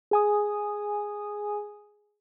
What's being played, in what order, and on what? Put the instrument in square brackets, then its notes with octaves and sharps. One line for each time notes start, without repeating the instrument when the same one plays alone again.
[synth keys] G#4 G#5 D#6